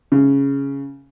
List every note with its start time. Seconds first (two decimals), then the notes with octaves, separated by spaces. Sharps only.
0.12 C#3